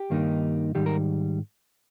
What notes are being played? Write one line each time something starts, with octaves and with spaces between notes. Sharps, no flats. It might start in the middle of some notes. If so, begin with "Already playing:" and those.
Already playing: G4
G2 D#3 A#3 D#4
G#2 D#3 G3 G4
A#4